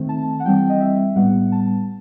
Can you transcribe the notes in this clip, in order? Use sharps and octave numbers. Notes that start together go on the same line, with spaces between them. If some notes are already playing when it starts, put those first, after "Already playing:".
Already playing: D#3 A3 C4
A5
F#5
E3 G3 C4 G5
D#5
E5
A2 G3 B3 F#5
A5